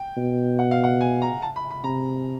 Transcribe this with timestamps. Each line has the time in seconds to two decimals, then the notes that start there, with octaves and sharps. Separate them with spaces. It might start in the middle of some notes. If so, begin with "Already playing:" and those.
Already playing: G5
0.17 B2
0.59 F#5
0.71 F5
0.84 F#5
1.01 G#5
1.22 A#5
1.42 A5
1.56 B5
1.71 B5
1.84 C3 A#5